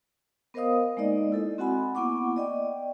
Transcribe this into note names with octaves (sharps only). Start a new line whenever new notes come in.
B3 A#4 C5 D#5 F5 D#6
G#3 A#3 D#4 D5 D#5
E4 A4 D#5
C4 F#4 F#5 G#5 B5
A#3 B3 E4 F#5 C#6 D6
D5 D#5 G5